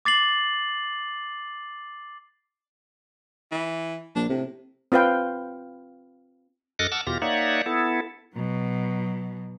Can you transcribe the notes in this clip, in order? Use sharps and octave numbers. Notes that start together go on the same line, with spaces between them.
D6 A6 C7 F#7
E3
A#1 D4
A2 C3
C4 F4 B4 F5 G5
F#2 A4 D#5 D6 F6 F#6
F#5 A5 D6 E6 F6
E2 B2 F4 G4 A#6
A#3 D#4 C#5 D5 E5 F#5
B3 E4 A4
B2 F#3